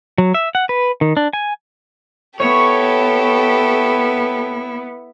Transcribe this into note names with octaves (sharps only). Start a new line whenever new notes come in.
F#3
E5
F#5
B4
D#3
D4
G#5
B3 E4 G4 A4 C#5